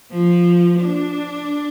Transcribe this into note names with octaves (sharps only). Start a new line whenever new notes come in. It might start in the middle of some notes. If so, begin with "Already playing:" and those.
F3
D4